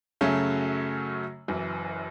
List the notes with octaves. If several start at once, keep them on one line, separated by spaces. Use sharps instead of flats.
F#2 C#3 F#3 A3 C#4
F#1 F#2 E3